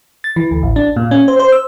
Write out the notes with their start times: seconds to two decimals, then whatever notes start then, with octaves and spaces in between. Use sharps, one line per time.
0.24 A6
0.36 E3
0.51 D2
0.63 A1
0.76 D4
0.96 A#2
1.11 C#4
1.28 C5
1.39 C5
1.52 E6